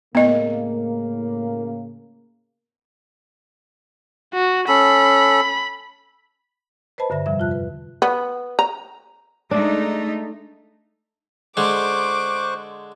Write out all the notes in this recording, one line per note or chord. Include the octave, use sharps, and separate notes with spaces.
A2 C#3 A#3 B3 D#5
F#4
C#4 A4 B5
B4 C5 D#5 A5 B5
G2 D3 E5 A#6
F2 C3 F3 G3 E5
E2 F4 A5 F#6
B4
B3
A#5
G#3 A3 D4 D#4
D3 G#3 C5 C#6 D6 F#6